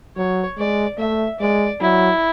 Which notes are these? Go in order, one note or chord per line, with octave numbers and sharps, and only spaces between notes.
F#3 C#5
G#3 D5
A3 E5
G#3 D5
F#3 E4